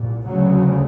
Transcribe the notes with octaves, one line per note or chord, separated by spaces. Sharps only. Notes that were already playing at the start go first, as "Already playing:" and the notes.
Already playing: C2 A#2
D2 C#3 F#3